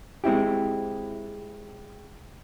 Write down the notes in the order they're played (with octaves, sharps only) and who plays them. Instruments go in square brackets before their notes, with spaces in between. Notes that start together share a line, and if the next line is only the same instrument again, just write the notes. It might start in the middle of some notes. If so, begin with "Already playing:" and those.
[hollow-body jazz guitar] G#3 C4 E4 G4